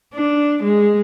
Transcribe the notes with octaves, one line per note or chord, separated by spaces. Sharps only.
D4
G#3